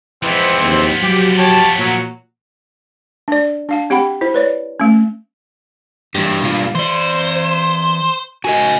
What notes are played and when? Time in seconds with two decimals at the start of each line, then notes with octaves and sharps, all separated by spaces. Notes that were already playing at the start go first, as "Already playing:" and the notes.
0.23 E3 F3 G#3 B3 C4
0.63 D#2
1.03 F#3 G4
1.38 G4 C#5 A5
1.78 A#2 F#3
3.28 D4 D5
3.69 D4 F5 A5
3.90 C4 G4 F#5 G5 B5
4.21 E4 C5
4.34 B4 C#5 D5
4.80 A3 C#4
6.15 G2 E3 A#3 G4
6.43 B2 A#3 F4
6.75 E3 C5 D5
8.45 C#3 F#4 A#4 D#5 G#5